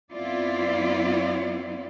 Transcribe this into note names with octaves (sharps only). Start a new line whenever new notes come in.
F#2 B3 C4 E4 F4 D5